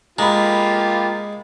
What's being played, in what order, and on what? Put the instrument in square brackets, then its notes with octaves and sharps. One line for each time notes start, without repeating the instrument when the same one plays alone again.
[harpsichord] G#3 [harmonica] A#3 F4 G4 [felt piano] A#5 B5